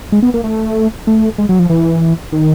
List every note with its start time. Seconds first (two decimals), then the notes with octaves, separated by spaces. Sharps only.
0.12 G#3
0.23 B3
0.34 A#3
0.44 A3
1.07 A3
1.38 G#3
1.49 F#3
1.59 F3
1.69 E3
2.32 D#3